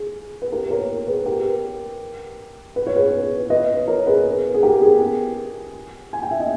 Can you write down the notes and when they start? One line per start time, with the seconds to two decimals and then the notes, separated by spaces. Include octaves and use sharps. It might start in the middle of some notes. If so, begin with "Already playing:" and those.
Already playing: G#4
0.42 B4
0.52 G4 A#4
0.70 A#4 C#5
1.07 G#4 B4
1.26 G4 A#4
2.76 B4
2.87 C#5
2.96 G#4 B4
3.50 B4 D#5
3.88 A#4 C#5
4.07 G#4 B4
4.54 G#4
4.63 G4 A#4
4.82 G#4
6.13 G#5
6.23 G5
6.31 E5
6.40 D#5